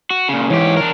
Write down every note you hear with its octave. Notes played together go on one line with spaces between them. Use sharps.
F#4
A#2 C#3
G#2 E3 G4 C#5
D4 A#4